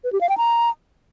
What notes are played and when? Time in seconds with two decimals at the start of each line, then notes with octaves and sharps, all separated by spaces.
0.04 B4
0.13 G4
0.21 F5
0.29 G5
0.38 A#5